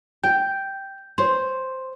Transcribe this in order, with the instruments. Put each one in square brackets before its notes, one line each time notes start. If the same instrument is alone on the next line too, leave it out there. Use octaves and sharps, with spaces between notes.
[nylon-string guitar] G5 [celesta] G6
[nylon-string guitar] C5 C#5 [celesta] C6